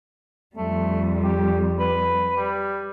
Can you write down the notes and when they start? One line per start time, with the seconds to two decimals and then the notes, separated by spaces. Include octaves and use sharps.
0.56 F2 G3 A3
1.23 G4
1.79 B4
2.37 G3